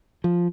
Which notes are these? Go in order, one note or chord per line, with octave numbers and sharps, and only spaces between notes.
F3